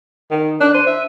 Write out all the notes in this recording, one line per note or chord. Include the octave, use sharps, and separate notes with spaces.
D#3
D4 F#6
C5 D#7
E5